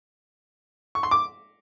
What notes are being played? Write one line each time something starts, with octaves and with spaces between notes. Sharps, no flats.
C#6
C6
D6